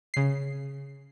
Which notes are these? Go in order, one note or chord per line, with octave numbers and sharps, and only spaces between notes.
C#3 C7